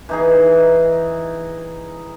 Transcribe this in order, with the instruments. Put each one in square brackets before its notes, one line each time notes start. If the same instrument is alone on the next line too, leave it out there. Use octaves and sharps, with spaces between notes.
[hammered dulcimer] E3 D#4 G#4